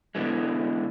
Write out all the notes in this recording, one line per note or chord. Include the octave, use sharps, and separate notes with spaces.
B2 D3 E3 G#3